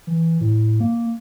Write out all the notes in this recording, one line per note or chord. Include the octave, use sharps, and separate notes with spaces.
E3
A2
A#3